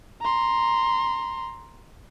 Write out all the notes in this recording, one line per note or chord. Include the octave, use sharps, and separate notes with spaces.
A#5 C6